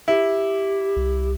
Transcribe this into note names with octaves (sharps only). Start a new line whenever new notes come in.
E4 G4
C2